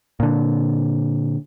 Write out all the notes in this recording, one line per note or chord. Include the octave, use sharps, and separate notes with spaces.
A#2 D3